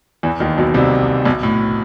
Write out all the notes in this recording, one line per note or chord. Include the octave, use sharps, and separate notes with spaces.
E2 E3
D#2 D#3
B1 B2
C2 C3
B1 B2
A2